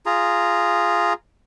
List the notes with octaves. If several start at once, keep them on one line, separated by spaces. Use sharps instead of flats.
F4 G#4 A#5